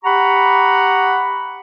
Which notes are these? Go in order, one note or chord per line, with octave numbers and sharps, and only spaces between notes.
G4 F#5 A#5 B5 C#6